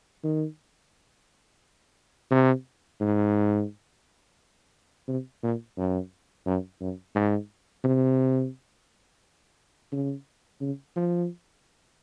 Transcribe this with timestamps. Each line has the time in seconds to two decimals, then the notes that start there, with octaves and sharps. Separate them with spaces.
0.24 D#3
2.31 C3
3.00 G#2
5.08 C3
5.43 A#2
5.78 F#2
6.46 F#2
6.81 F#2
7.15 G#2
7.84 C3
9.92 C#3
10.61 C#3
10.96 F3